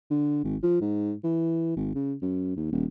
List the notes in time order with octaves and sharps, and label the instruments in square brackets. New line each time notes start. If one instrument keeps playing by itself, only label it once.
[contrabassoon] D3
G#1
F3
G#2
E3
G#1
C#3
F#2
D#2
D#1